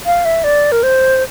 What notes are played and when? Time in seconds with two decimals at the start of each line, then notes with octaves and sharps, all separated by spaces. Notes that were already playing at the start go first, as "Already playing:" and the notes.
0.06 F5
0.25 E5
0.44 D5
0.72 A#4
0.83 C5